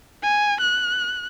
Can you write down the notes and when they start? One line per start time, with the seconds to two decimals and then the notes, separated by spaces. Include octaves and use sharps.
0.23 G#5
0.61 F#6